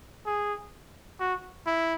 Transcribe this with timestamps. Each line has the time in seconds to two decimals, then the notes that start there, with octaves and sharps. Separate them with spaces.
0.26 G#4
1.20 F#4
1.67 E4